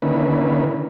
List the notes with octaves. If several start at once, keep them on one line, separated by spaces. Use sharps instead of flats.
D3 D#3 A#3 C#4 E4 B4